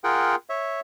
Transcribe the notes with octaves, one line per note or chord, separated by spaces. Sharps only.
F4 G#4 A#4 F#5 G5
C#5 E5